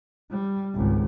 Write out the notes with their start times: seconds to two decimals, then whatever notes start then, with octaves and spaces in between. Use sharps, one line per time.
0.30 G3
0.74 G#1 C#2